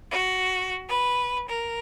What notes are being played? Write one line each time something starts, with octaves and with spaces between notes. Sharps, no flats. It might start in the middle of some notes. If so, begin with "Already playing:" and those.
F#4
B4
A#4